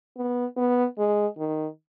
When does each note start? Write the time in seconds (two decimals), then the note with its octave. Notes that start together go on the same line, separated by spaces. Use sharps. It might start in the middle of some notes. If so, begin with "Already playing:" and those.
0.18 B3
0.57 B3
0.99 G#3
1.38 D#3